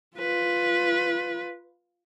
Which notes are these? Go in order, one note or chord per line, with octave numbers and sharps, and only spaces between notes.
F4 B4